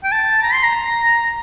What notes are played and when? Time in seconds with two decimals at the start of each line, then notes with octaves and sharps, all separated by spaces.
0.04 G5
0.12 A5
0.43 A#5
0.53 C6
0.63 A#5